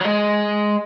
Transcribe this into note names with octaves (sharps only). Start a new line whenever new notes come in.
F#3
G#3